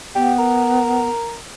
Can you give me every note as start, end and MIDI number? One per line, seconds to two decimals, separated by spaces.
0.15 1.08 59
0.15 0.33 67
0.39 1.37 70